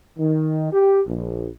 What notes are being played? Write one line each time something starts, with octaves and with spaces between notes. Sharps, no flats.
D#3
G4
A#1